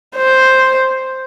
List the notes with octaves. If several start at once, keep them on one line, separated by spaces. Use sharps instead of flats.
C5